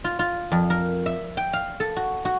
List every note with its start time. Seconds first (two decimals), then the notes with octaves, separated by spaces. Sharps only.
0.04 F4
0.19 F4
0.52 F2
0.70 A#4
1.06 E5
1.37 G5
1.53 F5
1.80 A4
1.96 F#4
2.25 F#4